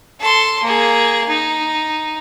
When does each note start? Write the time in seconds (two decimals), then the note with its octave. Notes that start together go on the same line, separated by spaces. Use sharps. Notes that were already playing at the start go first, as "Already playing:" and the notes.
0.20 A4 C6
0.63 A#3 G#4
1.28 D#4